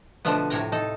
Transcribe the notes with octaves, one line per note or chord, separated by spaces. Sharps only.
B2 D3 F3 A3 B3
A2 C3 C#5 G5 A#5
D#4 A4